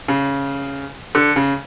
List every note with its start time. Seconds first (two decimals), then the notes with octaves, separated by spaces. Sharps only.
0.08 C#3
1.15 D3
1.36 C#3